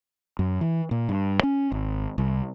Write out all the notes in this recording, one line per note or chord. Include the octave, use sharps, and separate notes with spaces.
F#2
E3
A#2
G2
C#4
G#1
C2